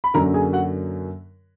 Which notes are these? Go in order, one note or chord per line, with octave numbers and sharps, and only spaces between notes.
B5
F#2 D3 F#3 A#3 A#4 A#5
G#4 G#5
F#4 F#5